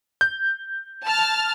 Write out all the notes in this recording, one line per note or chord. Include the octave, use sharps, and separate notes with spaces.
G6
A5 F6 A6